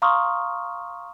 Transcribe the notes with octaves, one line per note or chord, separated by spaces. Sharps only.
F5 A#5 C6 C#6 D#6 F6